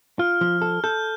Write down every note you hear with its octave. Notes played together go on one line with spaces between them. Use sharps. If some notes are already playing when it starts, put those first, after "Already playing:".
F4 F6
F3
A4
A4 G6